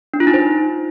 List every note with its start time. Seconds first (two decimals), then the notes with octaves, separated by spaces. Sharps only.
0.14 D4
0.20 F4
0.27 D#4
0.34 C5